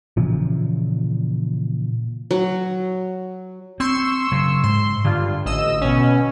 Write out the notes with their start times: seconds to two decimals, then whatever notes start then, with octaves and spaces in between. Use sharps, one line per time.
0.17 A#2 C#3 E3 F3
2.31 F#3
3.80 C4 C6 C#6 E6
4.32 C#3 F#3
4.64 G#2 C6
5.05 G2 D3 F4
5.45 A1 D#5 E6
5.81 B2 C#4